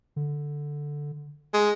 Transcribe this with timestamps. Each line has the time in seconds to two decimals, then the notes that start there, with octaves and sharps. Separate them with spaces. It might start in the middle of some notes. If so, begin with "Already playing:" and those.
0.16 D3
1.54 G#3